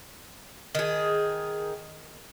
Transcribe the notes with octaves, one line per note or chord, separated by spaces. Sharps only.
D#3 G#4